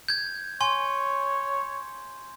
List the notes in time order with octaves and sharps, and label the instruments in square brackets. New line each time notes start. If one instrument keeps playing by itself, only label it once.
[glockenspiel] G6 G#6
[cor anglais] C#5 [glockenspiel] G#5 C6